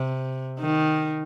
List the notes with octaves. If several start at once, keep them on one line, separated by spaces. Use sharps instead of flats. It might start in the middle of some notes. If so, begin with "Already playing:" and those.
Already playing: C3
D#3